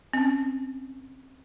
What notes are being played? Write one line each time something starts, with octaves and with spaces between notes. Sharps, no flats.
C4 C#4